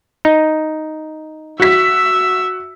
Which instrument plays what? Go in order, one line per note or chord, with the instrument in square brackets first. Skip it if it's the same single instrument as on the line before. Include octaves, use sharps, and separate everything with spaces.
[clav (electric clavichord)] D#4
[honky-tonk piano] F#4 B6 [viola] E5